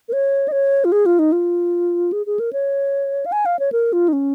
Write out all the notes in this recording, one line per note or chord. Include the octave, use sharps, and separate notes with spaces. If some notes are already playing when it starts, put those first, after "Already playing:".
A#4
C#5
D#5
C#5
F4
G#4
F4
D#4
F4
G#4
G#4
A#4
C#5
F5
G#5
F5
C#5
A#4
F4
D#4
C#4